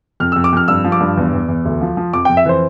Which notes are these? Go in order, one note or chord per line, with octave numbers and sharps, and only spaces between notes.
F2 F6
F2 E6
D6
F2 F6
G2 E6
F3
D6
G2
E2
E2
E2
D2
F3
F3
F2 D6
F2 G5
E5
E3 C5